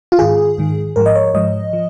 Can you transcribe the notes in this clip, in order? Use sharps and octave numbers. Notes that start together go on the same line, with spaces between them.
F4
G#2 D#3 G#4
G#2 D#3
G#2 F3 A#4
D#5
C#5
G#2 F3 D#5
F3